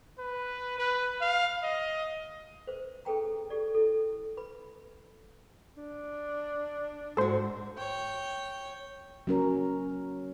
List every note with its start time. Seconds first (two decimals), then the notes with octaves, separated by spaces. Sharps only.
0.19 B4
0.78 B4
1.21 F5
1.63 D#5
2.67 B4 C5
3.05 C#4 G#4 A4 B4 G5 A#5
3.50 G4 A4 D5
3.75 E4 A4
4.37 B4 B5
5.77 D4
7.17 G#2 F#4 A4 C5
7.77 C#5 G5
9.27 F#3 C#4 A#4